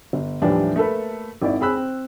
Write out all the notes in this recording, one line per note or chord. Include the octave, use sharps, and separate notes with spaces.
G1
D#2 A2 E3 F3 G3 D4
A3 A#3 A4 B4
G#1 D#3 E4 D5
C4 G#4 B5 E6 F#6
C4